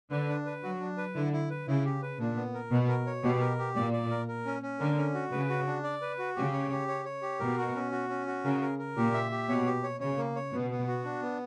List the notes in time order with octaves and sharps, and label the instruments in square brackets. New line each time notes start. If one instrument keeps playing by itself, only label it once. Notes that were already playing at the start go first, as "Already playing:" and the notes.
[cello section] D3 [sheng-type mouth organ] B4
[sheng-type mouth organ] D4
B4
[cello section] F#3 [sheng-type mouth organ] F#4
[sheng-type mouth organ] D4
B4
[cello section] D3 [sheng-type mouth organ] E4
[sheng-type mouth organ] E4
B4
[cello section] C#3 [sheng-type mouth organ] E4
[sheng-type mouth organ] G4
B4
[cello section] A#2 [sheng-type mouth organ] D4
[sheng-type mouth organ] B3
A#4
[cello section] B2 [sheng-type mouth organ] B3
[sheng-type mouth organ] A#4
C#5
[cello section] B2 [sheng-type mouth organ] G4
[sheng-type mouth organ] A#4
G4
[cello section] A#2 [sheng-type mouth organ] D5
[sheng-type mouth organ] D5
A#4
A#4
C#4
C#4
[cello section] D3 [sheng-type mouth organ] A#4
[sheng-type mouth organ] C#4
F#4
[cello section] C#3 [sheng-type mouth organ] B4
[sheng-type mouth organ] F#4
D4
D5
B4
F#4
[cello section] C#3 [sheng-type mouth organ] G4
[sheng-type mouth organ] C#5
G4
C#5
C#5
G4
[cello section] B2 [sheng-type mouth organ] A#4
[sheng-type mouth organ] F#4
C#4
F#4
C#4
F#4
[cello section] C#3 [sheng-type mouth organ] A#4
[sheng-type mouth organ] A#4
A#4
[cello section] A#2 [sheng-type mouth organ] G4
[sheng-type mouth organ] E5
G4
[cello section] B2 [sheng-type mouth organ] C#5
[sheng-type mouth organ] G4
C#5
[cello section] C#3 [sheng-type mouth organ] C#5
[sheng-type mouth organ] A#3
C#5
[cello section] B2 [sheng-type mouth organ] B3
[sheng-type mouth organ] B3
F#4
D4
B3